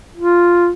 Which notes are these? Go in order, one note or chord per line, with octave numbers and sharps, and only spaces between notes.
F4